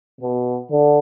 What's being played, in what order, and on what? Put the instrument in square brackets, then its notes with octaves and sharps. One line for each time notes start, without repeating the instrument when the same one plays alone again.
[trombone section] B2
D3